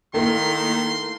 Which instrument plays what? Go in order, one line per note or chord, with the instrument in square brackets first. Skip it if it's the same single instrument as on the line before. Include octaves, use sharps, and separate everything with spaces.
[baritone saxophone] D#3 [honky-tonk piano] A3 A#3 E4 [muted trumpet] C6